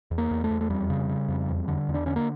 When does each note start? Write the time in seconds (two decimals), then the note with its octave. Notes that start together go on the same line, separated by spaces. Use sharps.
0.11 E2
0.18 A#3
0.31 E2
0.44 A3
0.50 E2
0.61 A3
0.70 F2 G3
0.90 C#3
1.09 C#3
1.28 F2
1.49 E2
1.68 D3
1.89 E2
1.94 D4
2.06 D3 C#4
2.16 A#3